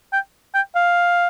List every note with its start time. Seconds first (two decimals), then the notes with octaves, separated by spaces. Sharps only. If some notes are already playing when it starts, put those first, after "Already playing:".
0.13 G5
0.54 G5
0.75 F5